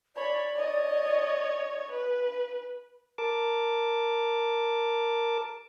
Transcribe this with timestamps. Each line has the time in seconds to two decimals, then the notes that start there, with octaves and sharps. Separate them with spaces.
0.16 C#5 D5 B5
0.55 C#5 D#5
1.91 B4
3.18 A#4 A5 D6